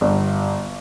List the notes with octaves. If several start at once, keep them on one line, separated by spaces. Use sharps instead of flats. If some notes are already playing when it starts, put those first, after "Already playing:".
G1